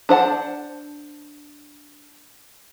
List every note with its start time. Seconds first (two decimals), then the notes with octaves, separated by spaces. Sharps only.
0.09 D4 C5 F#5 A5